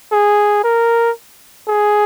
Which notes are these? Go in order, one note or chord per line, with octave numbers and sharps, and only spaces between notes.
G#4
A#4
G#4